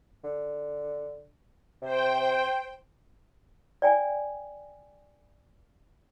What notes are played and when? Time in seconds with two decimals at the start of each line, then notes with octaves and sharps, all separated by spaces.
0.24 D3
1.82 C3 C5 G5
3.82 D5 G5 G#5